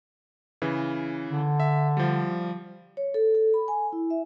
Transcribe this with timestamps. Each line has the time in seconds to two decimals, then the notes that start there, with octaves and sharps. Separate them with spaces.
0.62 C#3 E3
1.29 D3
1.60 E5
1.97 F3 G3
2.97 C#5
3.14 A4
3.35 A4
3.54 B5
3.68 G#5
3.92 E4
4.10 E5